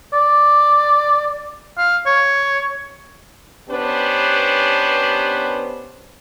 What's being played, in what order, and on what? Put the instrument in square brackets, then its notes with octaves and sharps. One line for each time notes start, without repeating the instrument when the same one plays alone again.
[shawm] D5
F5
C#5
[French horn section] B3 C#4 D4 G4 B4 C5